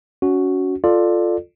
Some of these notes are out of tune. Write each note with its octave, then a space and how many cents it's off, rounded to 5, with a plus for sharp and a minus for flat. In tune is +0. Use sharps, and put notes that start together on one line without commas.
C#4 +25 F#4 +0
F4 +0 A4 +0 D5 +20